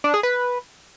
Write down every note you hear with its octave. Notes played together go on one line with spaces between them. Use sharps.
D4
G#4
B4